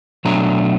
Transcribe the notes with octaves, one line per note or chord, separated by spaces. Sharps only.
B2 F#3 A3 D4 A#5